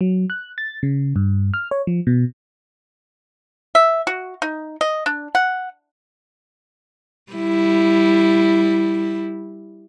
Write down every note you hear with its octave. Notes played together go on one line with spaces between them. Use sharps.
F#3
F#6
A6
C#3
G2
F6
C#5
F3
B2
E5
F#4
D#4
D#5
D4
F#5
G3 E4